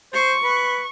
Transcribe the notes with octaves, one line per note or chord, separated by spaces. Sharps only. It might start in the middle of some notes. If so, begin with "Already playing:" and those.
C5 C#6
B4